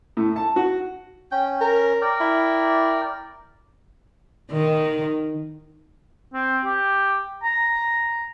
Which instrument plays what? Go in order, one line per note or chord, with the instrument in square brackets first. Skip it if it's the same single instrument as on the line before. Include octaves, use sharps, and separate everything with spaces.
[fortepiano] A2
A5
F#4
[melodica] C#4 [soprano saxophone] G5
[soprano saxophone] A#4
[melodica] A#4 D5 G5
[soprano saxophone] E4
[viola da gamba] D#3
[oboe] C4
G4
A#5